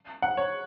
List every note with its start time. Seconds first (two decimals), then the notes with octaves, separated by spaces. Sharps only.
0.22 F#5
0.37 C#5